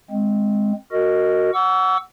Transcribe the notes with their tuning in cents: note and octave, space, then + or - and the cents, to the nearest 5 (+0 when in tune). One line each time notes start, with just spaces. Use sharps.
G#3 +0 C4 +0
F#4 +0 A#4 -20 D#5 +0
F#5 +0 C#6 +45 E6 +0